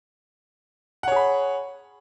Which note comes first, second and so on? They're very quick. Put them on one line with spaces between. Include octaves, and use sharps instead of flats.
F#5 C#5 G#4 B5